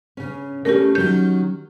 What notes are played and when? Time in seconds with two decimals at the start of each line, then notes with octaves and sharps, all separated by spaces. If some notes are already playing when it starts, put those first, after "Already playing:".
0.17 C#3 C#4
0.65 C#3 A3 C#4 G4 A#4
0.95 D#3 F#3 C#4 G6